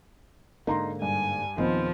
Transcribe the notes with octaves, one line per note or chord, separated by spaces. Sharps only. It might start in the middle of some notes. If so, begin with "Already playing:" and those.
G#2 D3 A#3 D#4 A#5 C6
G2 G#5
D#2 A#2 D#3 F3 B3 C4 D#5